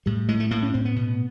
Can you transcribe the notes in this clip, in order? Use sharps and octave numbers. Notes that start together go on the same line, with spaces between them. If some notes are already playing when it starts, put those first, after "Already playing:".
A2 G3
A2 G#3
A3
A2 A#3
C#4
A2 C4
B3
B2